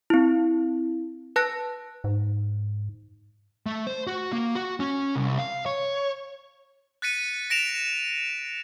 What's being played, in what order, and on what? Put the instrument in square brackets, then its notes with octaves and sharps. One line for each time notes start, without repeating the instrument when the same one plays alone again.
[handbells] C4 E4
B4 A5 F#6 A#6
[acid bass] G#2
[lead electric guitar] A3
C5
F#4
A#3
F#4
C#4
C2
F5
C#5
[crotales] F#6 A6 B6 C#7 D#7
A#6 D7 E7 F7